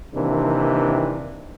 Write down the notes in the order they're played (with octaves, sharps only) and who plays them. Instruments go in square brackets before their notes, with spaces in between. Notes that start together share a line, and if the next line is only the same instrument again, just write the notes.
[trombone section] C3 D#3 E3 A#3 D4